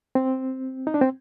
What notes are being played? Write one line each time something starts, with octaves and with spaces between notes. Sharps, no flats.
C4
D#4
D4
C4